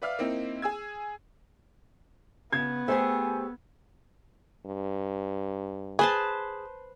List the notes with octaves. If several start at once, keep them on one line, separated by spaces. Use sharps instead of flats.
B4 D5 E5 F5 F6
A#3 C4 D#4 E4
G#4 G#5 E6 G#6
C#3 B3 G#6
A3 G4 G#4 C5 G#5
G2
G#4 B4 C5 A5